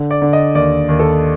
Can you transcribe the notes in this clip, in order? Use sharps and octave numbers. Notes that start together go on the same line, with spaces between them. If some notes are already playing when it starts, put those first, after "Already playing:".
Already playing: D3
D5
D3
D#5
D#2 D5
D#2
A4